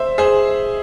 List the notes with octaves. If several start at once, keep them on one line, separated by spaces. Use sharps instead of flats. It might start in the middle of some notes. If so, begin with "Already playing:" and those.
Already playing: C5 E5
G#4 C5